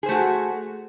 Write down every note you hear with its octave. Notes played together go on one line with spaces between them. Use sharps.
A3 F#4 G#4 C5